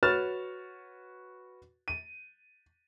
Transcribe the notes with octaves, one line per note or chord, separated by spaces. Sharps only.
F#4 B4 C#5 F6 A6 E7
D#7